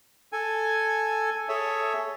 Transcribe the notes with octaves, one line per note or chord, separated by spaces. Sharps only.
A4 G#5
G#4 A4 C#5 E5